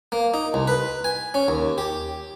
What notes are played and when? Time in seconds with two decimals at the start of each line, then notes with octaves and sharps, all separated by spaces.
0.12 A#3
0.34 D#4
0.54 C2
0.68 B4
1.04 G#5
1.34 C#4
1.48 D#2
1.78 G4